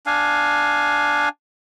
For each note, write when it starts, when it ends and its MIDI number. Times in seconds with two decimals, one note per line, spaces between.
0.06 1.29 62
0.06 1.29 77
0.06 1.29 80